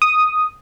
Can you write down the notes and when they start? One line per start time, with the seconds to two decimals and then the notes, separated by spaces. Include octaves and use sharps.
0.02 D#6